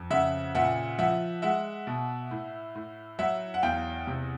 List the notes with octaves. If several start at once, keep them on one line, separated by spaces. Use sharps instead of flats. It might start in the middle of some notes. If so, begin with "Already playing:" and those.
Already playing: F2
C#3 E5 F#5
A#2 E5 F#5
F3 E5 F#5
G#3 E5 F#5
B2
A2
A2
F#3 E5 F#5
F#5
E2 F5 G5
C3